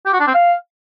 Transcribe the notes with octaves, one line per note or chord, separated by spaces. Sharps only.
G4
F#4
D4
C4
F5